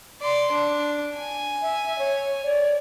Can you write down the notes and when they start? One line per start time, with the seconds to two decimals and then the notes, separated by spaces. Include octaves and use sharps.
0.21 D5 C6
0.52 D4
1.16 G#5
1.61 E5
1.99 C#5
2.44 C#5 D5